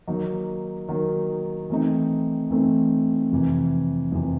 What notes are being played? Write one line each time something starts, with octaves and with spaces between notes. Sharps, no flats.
D#3 F#3 A#3 D#4
D#3 F#3 A#3 D#4
E3 A3 C4 D#4
E3 A3 C4 D#4
F2 C3 E3
F2 C3 E3